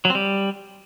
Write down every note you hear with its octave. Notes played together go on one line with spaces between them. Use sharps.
F#3
C4
G3